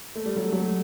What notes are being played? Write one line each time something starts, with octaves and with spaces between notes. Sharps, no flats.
A3
G3
F#3 A3
F#3 A3